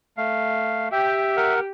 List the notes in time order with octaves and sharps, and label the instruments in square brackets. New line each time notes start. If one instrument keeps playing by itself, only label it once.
[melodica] A3 [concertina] F5
[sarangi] G4 [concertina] E5 [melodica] G5
[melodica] A#4 F#5